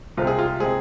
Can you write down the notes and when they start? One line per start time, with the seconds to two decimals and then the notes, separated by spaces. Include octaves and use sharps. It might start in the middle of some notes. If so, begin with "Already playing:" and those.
0.17 C2 C3 G#3 C4 F4
0.27 G#4
0.39 F4
0.60 C3 G#3 C4 G#4